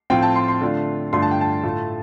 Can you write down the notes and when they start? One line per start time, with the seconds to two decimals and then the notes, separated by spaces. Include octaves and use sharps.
0.10 A2 F3 C4 F4 G5
0.22 A5
0.36 C6
0.48 C6
0.61 D3 A3 D4 F4
1.13 G2 D3 A3 D4 F4 C6
1.22 A5
1.31 G5
1.41 A5
1.64 A2 A3 F4